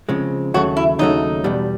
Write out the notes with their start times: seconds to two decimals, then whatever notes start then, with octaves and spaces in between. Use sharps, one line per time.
0.09 C#3 F3 G#3 C4
0.54 D#2 C#3 F#3 A3 F#4
0.77 E4
0.99 D#2 C#3 F#3 A3 D#4
1.44 E2 B2 G3